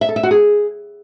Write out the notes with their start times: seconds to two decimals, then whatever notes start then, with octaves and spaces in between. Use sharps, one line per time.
0.01 E5
0.09 A4
0.16 E5
0.23 F#4
0.31 G#4